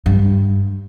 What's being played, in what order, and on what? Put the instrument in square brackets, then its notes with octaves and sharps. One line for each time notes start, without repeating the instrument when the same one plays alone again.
[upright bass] G2